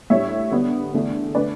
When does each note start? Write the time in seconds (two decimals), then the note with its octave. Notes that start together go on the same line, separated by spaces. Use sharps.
0.10 A2 G3 D4 C#5 E5
0.51 D3 G3 B3 D4
0.94 E2 D3 A3 D4
1.35 D3 A3 D4 B4 D5